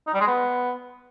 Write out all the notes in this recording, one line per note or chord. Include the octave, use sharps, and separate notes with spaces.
D#4
G3
G#3
B3